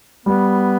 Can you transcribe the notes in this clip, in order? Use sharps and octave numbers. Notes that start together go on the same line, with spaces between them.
G3 B3